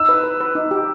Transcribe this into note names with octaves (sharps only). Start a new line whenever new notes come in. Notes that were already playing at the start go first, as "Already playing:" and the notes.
Already playing: D#4 E6
B4
B4
B4
D#4
G4